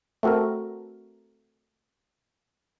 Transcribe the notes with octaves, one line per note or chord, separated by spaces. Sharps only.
A3 C4 F#4 A4 A#4